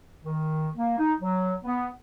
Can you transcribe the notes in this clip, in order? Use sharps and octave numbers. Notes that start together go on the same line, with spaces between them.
D#3
A#3
D#4
F#3
B3